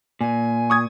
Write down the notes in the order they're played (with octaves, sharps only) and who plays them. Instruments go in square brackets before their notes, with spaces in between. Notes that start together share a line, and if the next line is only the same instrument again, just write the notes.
[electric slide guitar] A#2 [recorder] G#5
[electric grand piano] C#6 D#6 G#6